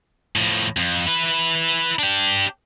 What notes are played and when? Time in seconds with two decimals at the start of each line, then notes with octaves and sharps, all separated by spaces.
0.36 A2 F3
0.77 F2
1.07 E4 B4
1.99 D4 G4